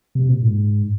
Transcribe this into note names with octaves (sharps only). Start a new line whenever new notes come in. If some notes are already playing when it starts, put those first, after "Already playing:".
C3
A#2
G#2